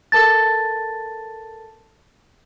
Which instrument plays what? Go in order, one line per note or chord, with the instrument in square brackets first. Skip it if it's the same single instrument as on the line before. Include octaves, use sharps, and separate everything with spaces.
[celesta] A4 A#4 A5 A6